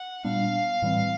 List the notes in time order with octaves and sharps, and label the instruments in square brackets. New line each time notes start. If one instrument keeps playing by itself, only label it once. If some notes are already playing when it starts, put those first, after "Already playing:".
Already playing: [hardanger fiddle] F#5
[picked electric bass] A#2 G3 B3 D4 [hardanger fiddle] F5
[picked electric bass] A2 E3 G3 C4